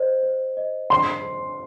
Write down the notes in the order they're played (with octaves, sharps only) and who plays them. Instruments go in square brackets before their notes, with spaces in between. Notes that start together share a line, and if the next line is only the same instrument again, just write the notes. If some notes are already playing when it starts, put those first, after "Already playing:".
Already playing: [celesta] C5 D#5
C5
D#5
[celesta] D#5 [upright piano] C6
[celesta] C5